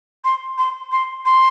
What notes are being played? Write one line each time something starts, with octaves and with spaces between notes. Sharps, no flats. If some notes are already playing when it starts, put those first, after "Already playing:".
C6
C6
C6
C6